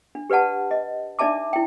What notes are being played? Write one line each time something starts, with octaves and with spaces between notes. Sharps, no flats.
D4
G4 B4 D5 F#5 A5
D#5
D4 D#4 D5 E5 A5 D6
E4 G5